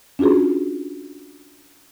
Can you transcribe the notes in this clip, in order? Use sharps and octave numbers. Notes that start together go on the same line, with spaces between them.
C#4 D4 F4 F#4 G#4